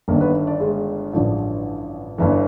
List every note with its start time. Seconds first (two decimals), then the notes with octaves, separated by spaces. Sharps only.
0.08 G1 G2 D#3 A#3 A#4
0.21 B3 B4
0.47 D4 D5
0.60 G#3 G#4
1.13 A1 G2 D3 F3
2.18 G1 G2 E3